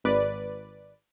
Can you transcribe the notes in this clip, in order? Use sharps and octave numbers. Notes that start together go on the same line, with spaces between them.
G#1 B4 D5